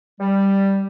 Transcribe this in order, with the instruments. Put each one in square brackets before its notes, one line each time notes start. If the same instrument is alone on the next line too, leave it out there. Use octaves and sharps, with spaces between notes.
[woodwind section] G3